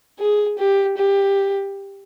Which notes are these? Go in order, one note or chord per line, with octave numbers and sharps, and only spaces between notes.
G#4
G4
G4